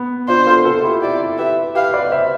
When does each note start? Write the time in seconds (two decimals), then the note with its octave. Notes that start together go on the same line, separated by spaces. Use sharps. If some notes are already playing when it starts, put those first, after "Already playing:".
Already playing: B3
0.28 D4 F4 C5
0.47 F4 A4
0.65 F4 A4
0.83 E4 G4
1.02 E4 G4 D5
1.38 G4 B4 E5
1.75 G4 B4 F5
1.93 B4 D5
2.12 C5 E5